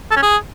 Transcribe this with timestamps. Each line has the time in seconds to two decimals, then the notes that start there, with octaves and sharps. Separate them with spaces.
0.11 A4
0.17 C#4
0.23 G#4